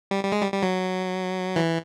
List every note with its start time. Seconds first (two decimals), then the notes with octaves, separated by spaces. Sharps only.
0.11 G3
0.24 G3
0.32 G#3
0.42 G3
0.52 G3
0.63 F#3
1.56 E3